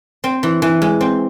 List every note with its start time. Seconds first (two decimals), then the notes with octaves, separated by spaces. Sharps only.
0.24 C4
0.43 E3
0.62 E3
0.82 G#3
1.01 C4